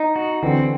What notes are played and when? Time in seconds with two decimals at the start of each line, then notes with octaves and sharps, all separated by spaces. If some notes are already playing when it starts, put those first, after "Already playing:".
Already playing: D#4
0.16 F#4
0.42 D3 E3 C4